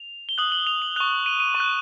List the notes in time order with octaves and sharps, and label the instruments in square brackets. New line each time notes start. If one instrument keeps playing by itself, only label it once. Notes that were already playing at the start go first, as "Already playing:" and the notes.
Already playing: [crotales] F7
G7
D#6 F#6 F#7
F#7
F7
F#7
C#6 F#6 F7
D#7
D#7
C#6
F#6